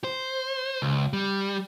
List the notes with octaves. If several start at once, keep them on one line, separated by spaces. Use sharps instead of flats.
C5
C#2
G3